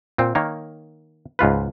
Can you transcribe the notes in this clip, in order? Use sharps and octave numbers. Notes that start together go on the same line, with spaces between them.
A#2 C4
D#3 A#3 C#5
C#2 G#2 F4 B4